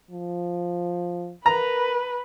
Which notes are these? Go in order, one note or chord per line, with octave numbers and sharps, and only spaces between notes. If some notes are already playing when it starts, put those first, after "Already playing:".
F3
A#4 B4 A#5